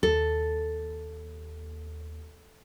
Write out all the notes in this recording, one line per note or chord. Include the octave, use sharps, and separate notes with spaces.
D#2 A4